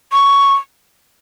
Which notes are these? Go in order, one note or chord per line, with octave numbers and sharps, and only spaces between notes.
C#6